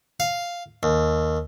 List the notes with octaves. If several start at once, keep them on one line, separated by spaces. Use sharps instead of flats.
F5
D#2